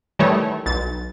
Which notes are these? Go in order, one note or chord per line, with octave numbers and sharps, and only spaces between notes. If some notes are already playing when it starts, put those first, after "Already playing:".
D#3 E3 G3 A3 E4 C#5
B1 A6